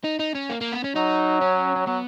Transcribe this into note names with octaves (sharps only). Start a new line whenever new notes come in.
D#4
D#4
C#4
A#3
A#3
B3
C#4
F#3 D#4
C#4
C#4
F#3 B3